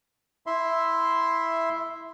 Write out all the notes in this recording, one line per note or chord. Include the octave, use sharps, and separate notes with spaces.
E4 E5 C6